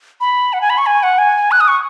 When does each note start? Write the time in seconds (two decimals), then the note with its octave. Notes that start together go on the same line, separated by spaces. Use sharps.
0.21 B5
0.53 F#5
0.61 G#5
0.70 B5
0.78 C#6
0.86 G#5
1.03 F#5
1.18 G#5
1.52 F#6
1.60 D#6
1.68 C#6